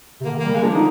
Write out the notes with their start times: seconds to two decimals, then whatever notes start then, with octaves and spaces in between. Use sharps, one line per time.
0.21 C3
0.25 D3 A#3
0.35 D#3 A#3
0.45 G3
0.54 G#3 A#3
0.64 F3 D4
0.74 D3 D#4